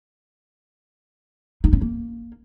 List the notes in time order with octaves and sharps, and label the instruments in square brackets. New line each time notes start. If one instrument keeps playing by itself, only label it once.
[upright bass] D#4
C#4
A#3